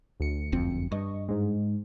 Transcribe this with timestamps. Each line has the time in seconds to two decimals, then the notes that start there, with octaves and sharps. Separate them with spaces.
0.20 D2 C#7
0.52 F#1 F2 C4
0.92 G2 D#5 C#6
1.29 G#2 G#3